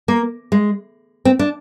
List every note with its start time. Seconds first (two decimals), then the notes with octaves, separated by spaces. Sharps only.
0.08 A#3
0.52 G#3
1.25 C4
1.39 D4